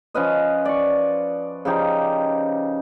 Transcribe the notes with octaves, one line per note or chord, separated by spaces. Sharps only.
F3 C#4 B4 D#5
D5 C#6
C#3 F3 D#4 G4